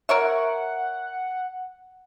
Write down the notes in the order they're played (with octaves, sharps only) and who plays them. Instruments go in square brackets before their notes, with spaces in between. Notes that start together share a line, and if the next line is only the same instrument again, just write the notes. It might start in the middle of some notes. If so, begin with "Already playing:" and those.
[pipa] A#4 C#5 E5 [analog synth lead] F#5